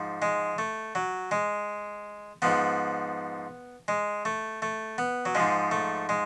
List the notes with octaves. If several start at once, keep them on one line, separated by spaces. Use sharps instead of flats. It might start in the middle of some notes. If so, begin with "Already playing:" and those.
Already playing: G#2 F3
G#3
A3
F#3
G#3
G#2 F3 B3
G#3
A3
A3
B3
F#3
G#2 F3 G#3
A3
G#3